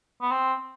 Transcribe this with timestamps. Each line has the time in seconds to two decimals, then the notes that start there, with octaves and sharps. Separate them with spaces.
0.22 B3
0.31 C4